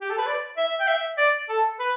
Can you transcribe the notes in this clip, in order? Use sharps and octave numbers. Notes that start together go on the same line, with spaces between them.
G4
A4
B4
D5
E5
G5
E5
D5
A4
B4